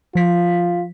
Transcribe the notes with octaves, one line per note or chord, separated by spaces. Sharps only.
F3 F4 B6